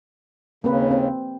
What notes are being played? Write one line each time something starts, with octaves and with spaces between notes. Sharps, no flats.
D#2 C#3 A#3 C4 B4
C4